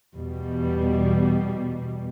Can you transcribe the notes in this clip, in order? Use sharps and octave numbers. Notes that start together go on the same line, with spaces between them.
E2 B2 G3